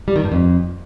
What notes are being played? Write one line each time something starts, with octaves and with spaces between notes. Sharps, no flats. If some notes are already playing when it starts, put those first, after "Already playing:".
G3
D#3
G2
F2